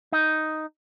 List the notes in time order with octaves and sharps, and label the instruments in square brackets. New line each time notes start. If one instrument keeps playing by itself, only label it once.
[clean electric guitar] D#4